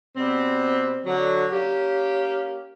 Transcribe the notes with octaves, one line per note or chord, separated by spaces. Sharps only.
B2 G3 C4
D3 F#3
A#3 C#4 G4